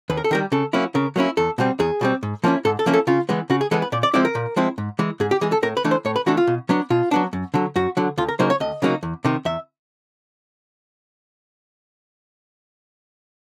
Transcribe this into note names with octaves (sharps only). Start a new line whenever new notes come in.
D#2 B4
A#4
A4
D#3 G3 A#4
C#3 A4
F#3 A#3 C#4 E4
C#3 A#4
F#3 A#3 C#4 E4
E2 A4
B2 G3 C4
E2 G#4
B2 G3 C4
G#2
F3 A#3 C#4 E4
G#2 A4
A4
F3 A#3 C#4 E4
A4
C#3 F4
E3 G#3 B3
C#3 F#4
G#4
E3 G#3 B3 A4
B4
A#2 D5
D5
F3 G#3 C4 E4 D5
A#4
A#2
F3 G#3 C4 E4
G#2
E3 G#3
G#2 G#4
G4
E3 G#3 G#4
A4
A2 A#4
B4
E3 A3 D4
C5
A2 C#5
B4
E3 A3 D4 F#4
F4
B2
F#3 B3 D4
B2 F4
F#3 B3 D4
F#2
D3 F#3
F#2 F#4
D3 F#3
D2 F4
A#4
C#3 F#3 A#3 D#4 C5
C#5
D2 D#5
C#3 F#3 A#3 D#4
E2
C3 D#3
E2 E5